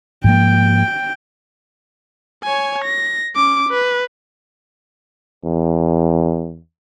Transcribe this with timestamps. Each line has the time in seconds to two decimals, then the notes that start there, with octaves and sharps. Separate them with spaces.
0.24 G#2 F3 A#3 G5
2.43 C#5 G#5
2.84 A#6
3.36 C#4 D6
3.69 B4
5.44 E2